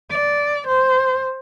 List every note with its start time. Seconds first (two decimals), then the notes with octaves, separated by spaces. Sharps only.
0.11 D5
0.68 C5